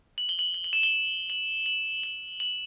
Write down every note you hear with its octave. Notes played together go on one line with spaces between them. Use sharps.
F#7
G7
F#7
G7
F#7
E7
G7
F#7
F#7
F#7
F#7